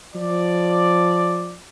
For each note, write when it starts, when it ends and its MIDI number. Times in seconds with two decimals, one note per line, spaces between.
0.15 1.56 53
0.15 1.56 74